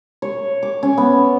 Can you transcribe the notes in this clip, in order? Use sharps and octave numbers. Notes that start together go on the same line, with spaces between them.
C#5
D6
C#4
B3